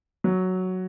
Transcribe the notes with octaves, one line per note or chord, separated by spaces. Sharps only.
F#3